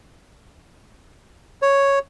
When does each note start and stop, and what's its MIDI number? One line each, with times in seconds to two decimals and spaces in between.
1.62 1.99 73